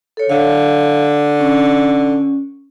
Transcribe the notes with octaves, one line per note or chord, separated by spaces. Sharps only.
A4 C#5
D3 F5
C#4